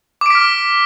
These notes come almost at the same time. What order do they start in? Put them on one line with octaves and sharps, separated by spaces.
D6 D7 B6 F6